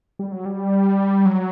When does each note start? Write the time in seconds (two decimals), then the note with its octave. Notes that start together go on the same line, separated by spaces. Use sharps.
0.19 G3
0.32 F#3
0.45 G3
1.26 F#3